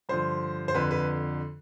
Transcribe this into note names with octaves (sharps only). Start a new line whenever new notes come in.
G2 D3 F3 C5
C5
F2 D3 F3 B4
B4